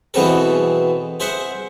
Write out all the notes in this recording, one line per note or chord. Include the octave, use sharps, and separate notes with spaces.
B2 E3 B3 C4 G#4 A4
G#4 C5 E5 F#5